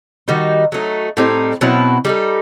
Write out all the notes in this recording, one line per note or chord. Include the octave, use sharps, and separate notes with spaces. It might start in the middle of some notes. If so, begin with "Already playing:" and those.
D#3 G3 D#4 F#4
F#3 A3 D#4
A2 G3 C4 D#4
B2 F#3 C4 E4
G3 D#4 A4